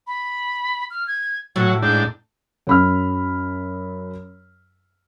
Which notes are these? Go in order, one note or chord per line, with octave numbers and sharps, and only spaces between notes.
B5
F6
G#6
A2 F#3 F#5
G#2 D4 G6
F#2 B5 F6